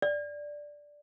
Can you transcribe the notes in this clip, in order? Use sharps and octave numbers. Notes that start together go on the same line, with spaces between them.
D5